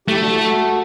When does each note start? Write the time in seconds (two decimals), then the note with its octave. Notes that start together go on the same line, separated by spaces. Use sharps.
0.08 A3 E4 G4
0.19 D4 F#4
0.30 F#4 A4
0.41 F#4 A4